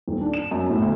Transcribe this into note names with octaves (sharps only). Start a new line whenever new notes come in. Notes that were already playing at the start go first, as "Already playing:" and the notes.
D#1
D4
E7
F#2
A2
D2